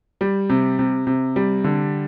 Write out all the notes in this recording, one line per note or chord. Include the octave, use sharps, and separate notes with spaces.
G3
C3
C3
C3
G3
D3